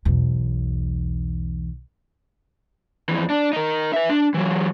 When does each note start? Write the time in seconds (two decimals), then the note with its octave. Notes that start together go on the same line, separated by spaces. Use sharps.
0.05 B1 E2
3.09 F2 E3
3.30 D4
3.53 D#4 A#4
3.93 B4 E5
4.09 D4
4.34 E3 F#3